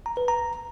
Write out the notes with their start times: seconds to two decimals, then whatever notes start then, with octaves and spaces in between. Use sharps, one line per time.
0.06 A#5
0.17 B4
0.28 A#5